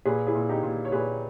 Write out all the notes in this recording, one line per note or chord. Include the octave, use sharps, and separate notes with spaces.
A#2 G#4 B4
E4 G#4
A#2
D#4 G4
A#2
C#5
A#2 G#4 B4